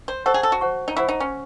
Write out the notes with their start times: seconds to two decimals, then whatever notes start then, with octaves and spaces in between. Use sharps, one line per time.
0.08 C5
0.26 A4 C5 F#5 C#6
0.34 G#4
0.43 A4
0.52 F#4
0.61 C5 F#5 C#6
0.88 D#4
0.96 E4 C5 F#5 C#6
1.09 D#4
1.20 C#4